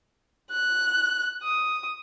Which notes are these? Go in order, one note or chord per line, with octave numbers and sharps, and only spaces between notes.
F#6
D#6